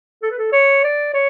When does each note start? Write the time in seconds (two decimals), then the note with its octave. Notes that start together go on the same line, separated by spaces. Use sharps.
0.22 A4
0.30 B4
0.38 A4
0.52 C#5
0.84 D5
1.14 C#5